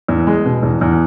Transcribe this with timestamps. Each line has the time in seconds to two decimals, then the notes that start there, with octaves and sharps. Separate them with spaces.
0.08 E2
0.27 G#3
0.45 B2
0.63 E2
0.81 E2